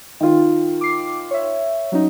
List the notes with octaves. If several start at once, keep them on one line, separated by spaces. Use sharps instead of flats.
D#3 F4
D6 C7
C#5 E5
F#3 C#4 D#4